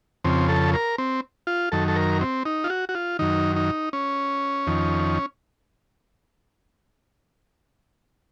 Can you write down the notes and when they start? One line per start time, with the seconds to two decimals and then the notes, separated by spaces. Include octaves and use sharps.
0.24 F2 C#3 C4
0.49 A4
0.74 A#4
0.98 C4
1.47 F4
1.72 F#2 D#3 A4
1.88 A4
1.96 A#4
2.21 C4
2.45 D#4
2.64 F4
2.70 F#4
2.89 F#4
2.95 F4
3.19 F#2 D#3 D#4
3.56 D#4
3.93 C#4
4.67 F2 D#3